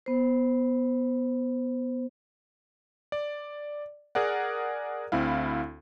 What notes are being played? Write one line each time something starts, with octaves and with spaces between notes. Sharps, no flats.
B3 C5
D5
G#4 A#4 D5 F#5
D2 C4 E4 F5